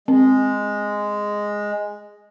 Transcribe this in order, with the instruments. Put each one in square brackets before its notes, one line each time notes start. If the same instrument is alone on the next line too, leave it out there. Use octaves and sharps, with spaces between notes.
[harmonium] G#3 [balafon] C4